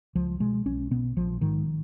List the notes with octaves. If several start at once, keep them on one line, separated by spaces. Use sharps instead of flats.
C#2 F3
B2 G#3
B1 C#4
B2 B3
A#1 F3
G#2 D#3